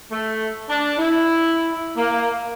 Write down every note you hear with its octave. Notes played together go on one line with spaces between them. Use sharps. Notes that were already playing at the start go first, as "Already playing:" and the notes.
A3
D4
E4
A#3